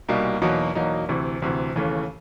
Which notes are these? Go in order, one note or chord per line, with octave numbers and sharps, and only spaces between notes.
C2 B2 G3 A#3 D#4
E2 B2 F#3 A#3 D#4
E2 B2 F#3 A#3 D#4
D2 C3 E3
D2 C3 E3
D#2 C#3 E3 A3